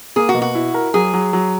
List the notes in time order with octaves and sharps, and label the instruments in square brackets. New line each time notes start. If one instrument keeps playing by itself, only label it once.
[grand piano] A#3 [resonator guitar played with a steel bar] G#4
[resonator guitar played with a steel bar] F#4
[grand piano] B2
[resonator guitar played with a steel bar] F#4
[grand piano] E4
A#4
[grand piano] F#3 [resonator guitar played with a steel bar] G#4
[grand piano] F#3
F#3